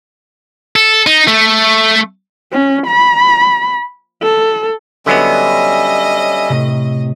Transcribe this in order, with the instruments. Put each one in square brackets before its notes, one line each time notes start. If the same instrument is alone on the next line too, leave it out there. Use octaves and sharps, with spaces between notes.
[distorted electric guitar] A4
D#4
A3
[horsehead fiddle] C#4
B5
A4
[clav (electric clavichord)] D3 F#3 B3 [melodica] G3 C#4 E5 [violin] D#5
[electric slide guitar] A2 C3